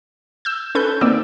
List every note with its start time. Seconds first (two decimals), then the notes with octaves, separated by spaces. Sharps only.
0.45 E6 G6
0.75 C#4 A4 B4 G6
1.01 D#3 A#3 C4 D5 E6